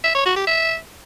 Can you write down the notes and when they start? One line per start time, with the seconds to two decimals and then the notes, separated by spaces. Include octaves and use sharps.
0.04 E5
0.15 C#5
0.26 F#4
0.36 G4
0.47 E5